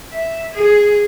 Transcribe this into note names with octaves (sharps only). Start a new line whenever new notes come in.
E5
G#4